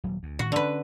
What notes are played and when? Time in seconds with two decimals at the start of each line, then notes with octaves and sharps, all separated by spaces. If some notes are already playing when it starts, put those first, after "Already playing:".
0.04 D#1 F#3
0.23 D2
0.39 A2 D#3 F#4
0.52 D3 C#4 B4